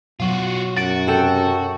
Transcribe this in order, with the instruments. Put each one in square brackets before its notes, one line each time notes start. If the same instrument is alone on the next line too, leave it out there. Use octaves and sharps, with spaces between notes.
[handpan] B2 F#3 [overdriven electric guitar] F4 F#4
[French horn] F#2 [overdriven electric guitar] F#4 [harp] A6 D7
[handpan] C3 [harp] A4 G5 E7